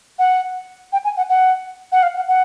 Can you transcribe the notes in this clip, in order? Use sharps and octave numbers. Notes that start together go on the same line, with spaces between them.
F#5
G5
G#5
F#5
F#5
F#5
F5
F#5
F#5